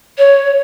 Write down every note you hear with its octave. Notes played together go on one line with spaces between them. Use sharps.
C#5